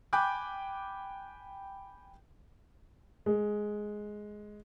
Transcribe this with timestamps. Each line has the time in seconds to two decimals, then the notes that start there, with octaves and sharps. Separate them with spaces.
0.13 G5 G#5 B5 D6 F#6 G6
3.26 G#3